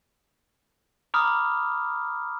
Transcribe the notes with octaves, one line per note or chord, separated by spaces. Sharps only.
A#5 B5 D6 D#6 F6